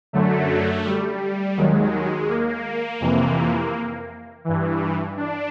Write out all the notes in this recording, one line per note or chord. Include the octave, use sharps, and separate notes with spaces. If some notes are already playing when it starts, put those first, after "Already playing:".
F#2 D3 F#3 A3
G3
D#2 D#3 F#3 G#3
A#3
F2 C3 E3
G2 E3
D4